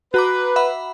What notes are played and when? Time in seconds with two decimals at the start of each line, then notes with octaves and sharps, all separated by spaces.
0.14 F#4 B4 A#5 D6
0.56 E5 F#5 B5